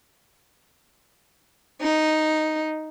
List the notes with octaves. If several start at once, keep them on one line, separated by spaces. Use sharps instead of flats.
D#4